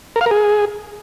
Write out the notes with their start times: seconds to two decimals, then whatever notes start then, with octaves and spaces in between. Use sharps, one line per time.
0.16 A#4
0.21 F5
0.26 A#4
0.31 G#4